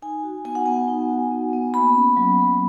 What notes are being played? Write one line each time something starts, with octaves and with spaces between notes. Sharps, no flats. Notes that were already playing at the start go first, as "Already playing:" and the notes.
D#4 G#5
F#4
B3 G#5
F#5
B3 G#5
D#4
F#4
B3
B3
A#3 B5
C#4
F#3
F#3